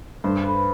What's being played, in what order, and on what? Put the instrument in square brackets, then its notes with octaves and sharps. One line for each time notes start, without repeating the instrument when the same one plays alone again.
[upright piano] G2 [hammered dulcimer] C5
[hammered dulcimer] B4